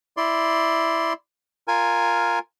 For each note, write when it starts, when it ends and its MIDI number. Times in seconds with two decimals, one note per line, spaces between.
0.17 1.13 64
0.17 1.13 74
0.17 1.13 84
1.68 2.39 65
1.68 2.39 70
1.68 2.39 80